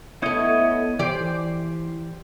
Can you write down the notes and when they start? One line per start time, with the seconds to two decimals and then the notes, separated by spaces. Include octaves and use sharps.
0.22 A3 B3 E4 C#5 D#5
0.99 E3 G4 C5 D5